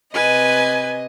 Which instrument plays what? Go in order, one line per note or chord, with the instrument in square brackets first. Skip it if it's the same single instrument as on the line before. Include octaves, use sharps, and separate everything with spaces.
[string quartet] C3 D#5 [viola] B4 G#5